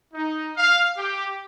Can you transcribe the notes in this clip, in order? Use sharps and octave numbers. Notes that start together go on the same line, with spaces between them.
D#4
F5
G4